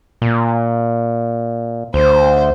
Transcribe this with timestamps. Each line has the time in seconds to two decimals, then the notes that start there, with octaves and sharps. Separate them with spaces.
0.22 A#2
1.94 D2 C5